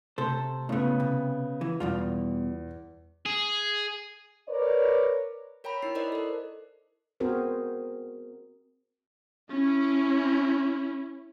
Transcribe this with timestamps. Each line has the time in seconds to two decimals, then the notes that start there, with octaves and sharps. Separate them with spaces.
0.18 C3 A3 A4 C5
0.69 A2 C#3 A3 B3
1.00 C3
1.61 E3
1.80 E2 B2 G3 F4
3.26 G#4
4.48 A#4 B4 C#5 D5
5.64 A#4 C#5 G5 A#5 B5
5.82 D#4 E4 C7
5.95 A#4 C5 D5 D#5
6.12 A4 C5
7.20 B3 C4 F#4 G#4 A#4 C5
9.51 C#4 E4